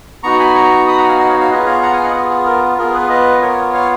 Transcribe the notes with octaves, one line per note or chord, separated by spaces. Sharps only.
B3 D#4 F#4 A#5 C#6
G#5 B5
A#5 C#6
B5 D#6
F#5 A#5
F5 G#5
D#5 F#5
C#5 F5
C#5 F5
B3 F4 G#4 B4 D#5
C#5 F5
F#5 A#5
F5 G#5
D#5 F#5
G#4
G#4
A#4
B3 F4 G#4 A#4
G#4 B4
B4 D#5
A#4 C#5
C#5 F5